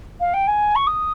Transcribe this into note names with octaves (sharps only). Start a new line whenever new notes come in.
F5
G5
G#5
C#6
D#6